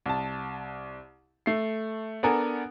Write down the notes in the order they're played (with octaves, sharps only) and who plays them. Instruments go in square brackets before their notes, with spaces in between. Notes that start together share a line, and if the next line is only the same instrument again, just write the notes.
[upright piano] C2 A5
A3 C7
B3 D4 A4 A#4 F#5 G#5